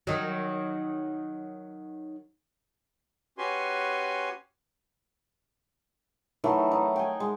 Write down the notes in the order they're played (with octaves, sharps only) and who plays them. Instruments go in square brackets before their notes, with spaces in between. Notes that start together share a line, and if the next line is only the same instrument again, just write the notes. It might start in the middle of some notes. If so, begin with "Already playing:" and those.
[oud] D#3 F#3
[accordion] C#4 F#4 G4 B4 G#5 C6
[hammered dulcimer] D#3 E3 F#3 A3
D#4
G5 G#5
G#3